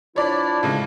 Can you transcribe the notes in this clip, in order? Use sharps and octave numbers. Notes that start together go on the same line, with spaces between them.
F3 D4 E4 C#5 D5 B5
A2 C#3 G#3